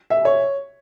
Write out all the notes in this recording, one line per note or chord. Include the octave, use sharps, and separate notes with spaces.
E5
C#5